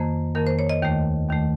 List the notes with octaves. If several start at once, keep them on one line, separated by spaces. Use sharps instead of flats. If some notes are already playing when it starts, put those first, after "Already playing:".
Already playing: F2 D#3 A#3 C5
F2 D#3 A#3 A#4
C5
C#5
D#5
D#2 D#3 A3
D#2 D#3 A3